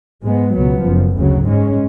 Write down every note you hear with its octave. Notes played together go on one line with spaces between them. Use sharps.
G#2 G#3 B3
C#2 B2 F#3 B3
F#1 F#2 F3
D2 C#3 F#3
G#2 G#3 C#4